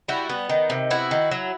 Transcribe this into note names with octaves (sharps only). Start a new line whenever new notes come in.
G3 E4 F#4
B3
D#3
C3
B3 E4 F#4
D#3
F#3